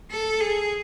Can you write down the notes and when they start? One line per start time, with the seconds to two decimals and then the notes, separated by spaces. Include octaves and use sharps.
0.11 A4
0.40 G#4